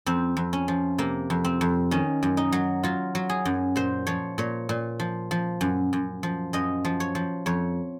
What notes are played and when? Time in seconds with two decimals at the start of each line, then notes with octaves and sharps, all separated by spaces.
0.06 F2 C4
0.37 F2
0.53 C#4
0.68 F3
0.98 C3 A#3
1.30 F2
1.44 C4
1.61 F2
1.91 D#3 C#4
2.23 F#2
2.37 D#4
2.52 F#3
2.83 F#3 F4
3.15 F#3
3.29 G#4
3.45 F#2
3.76 A#2 C5
4.07 F3 C#5
4.38 A#2 C#5
4.69 A#2
5.00 F3
5.31 F3
5.61 F#2
5.93 F#2
6.23 F3
6.53 F#2 D#5
6.85 F3
7.00 C#5
7.15 F3
7.46 F2 C#5